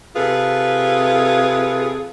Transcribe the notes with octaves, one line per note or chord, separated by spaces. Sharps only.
C3 F4 G#4 A4 B4